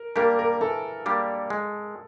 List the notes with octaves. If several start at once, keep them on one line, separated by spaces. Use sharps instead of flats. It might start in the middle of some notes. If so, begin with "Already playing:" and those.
Already playing: A#4
G3 A#3 D4 G4 A#4
A#4
E3 A4
G3 A#3 D4 G4
G#3